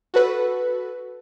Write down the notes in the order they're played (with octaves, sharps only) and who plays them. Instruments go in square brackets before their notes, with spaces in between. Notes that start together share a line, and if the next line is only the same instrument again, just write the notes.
[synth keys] F#4 A4 B4